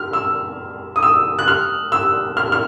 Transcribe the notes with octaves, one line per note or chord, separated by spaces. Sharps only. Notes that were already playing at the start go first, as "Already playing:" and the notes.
Already playing: F6
E6
D#6
E6
F#6
F6
E6
F6
F6